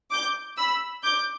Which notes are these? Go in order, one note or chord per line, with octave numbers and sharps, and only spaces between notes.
D6 G6
B5 E6
D6 G6